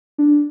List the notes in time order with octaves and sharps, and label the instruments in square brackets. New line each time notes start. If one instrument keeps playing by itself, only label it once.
[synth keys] D4